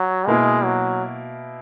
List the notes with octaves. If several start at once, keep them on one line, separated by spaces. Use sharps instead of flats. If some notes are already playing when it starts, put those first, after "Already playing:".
Already playing: F#3
B2 G#3 A#3 E4
F#3